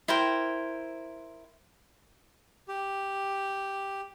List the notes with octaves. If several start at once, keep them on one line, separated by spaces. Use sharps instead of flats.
E4 A#4 C5 G5
G4